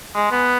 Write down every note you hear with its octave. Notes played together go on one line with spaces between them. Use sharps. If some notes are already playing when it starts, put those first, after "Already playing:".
G#3
B3